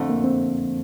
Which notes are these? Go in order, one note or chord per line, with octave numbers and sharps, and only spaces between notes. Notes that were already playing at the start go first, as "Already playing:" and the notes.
Already playing: F2 D3 A3 C4
A#3
C4